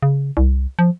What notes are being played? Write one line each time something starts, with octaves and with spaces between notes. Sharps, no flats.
C#3
C2
F3